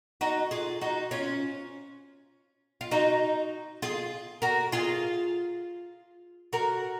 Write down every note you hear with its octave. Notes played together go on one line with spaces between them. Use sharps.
D#4 F#4
F4 G#4
D#4 F#4
C#4 F4
F4
D#4 F#4
F4 G#4
F#4 A#4
F4 G#4
F#4 A#4